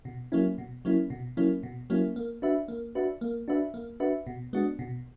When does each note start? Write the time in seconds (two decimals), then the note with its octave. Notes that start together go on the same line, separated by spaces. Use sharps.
0.05 B2
0.32 F#3 A#3 C#4 E4
0.58 B2
0.85 F#3 A#3 C#4 E4
1.10 B2
1.37 F#3 A#3 C#4 E4
1.63 B2
1.90 F#3 A#3 C#4 E4
2.16 A#3
2.42 D4 F#4 B4 E5
2.68 A#3
2.95 D4 F#4 B4 E5
3.21 A#3
3.48 D4 F#4 B4 E5
3.74 A#3
4.00 D4 F#4 B4 E5
4.27 B2
4.53 G#3 B3 D4 F#4
4.79 B2